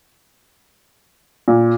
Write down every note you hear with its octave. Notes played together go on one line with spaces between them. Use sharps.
A#2